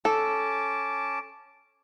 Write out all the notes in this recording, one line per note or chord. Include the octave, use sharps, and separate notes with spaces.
C#4 A4 A5 D6